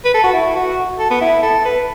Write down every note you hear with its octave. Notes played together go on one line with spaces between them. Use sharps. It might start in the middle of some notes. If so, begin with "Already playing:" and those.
B4
A4
F#4
E4
F#4
A4
B3
E4
A4
B4